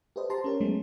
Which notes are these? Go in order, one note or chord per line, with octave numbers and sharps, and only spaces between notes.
G4 A4 B4 C5 D#5
G4 C5 A5 A#5 C6
C#4 A#4 C#5
F#3 G#3 A3 B3 C#4